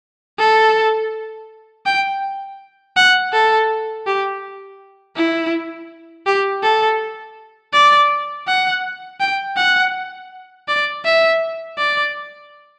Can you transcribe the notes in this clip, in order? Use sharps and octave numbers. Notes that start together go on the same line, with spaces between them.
A4
G5
F#5
A4
G4
E4
G4
A4
D5
F#5
G5
F#5
D5
E5
D5